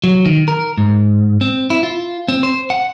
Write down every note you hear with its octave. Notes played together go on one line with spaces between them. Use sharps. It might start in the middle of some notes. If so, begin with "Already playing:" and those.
F#3
D#3
A#4
G#2
C4
E4
F4
C4
C5
F#5